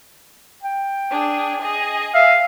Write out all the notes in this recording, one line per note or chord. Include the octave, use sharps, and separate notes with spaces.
G5
D4 G#4
G#4 D#5
E5 F5